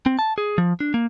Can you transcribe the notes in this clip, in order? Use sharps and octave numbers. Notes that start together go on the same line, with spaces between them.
C4
A5
G#4
F3
D4
A#3